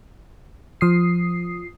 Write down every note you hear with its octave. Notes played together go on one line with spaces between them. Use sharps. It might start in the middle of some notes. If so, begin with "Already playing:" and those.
F3 D#6 C7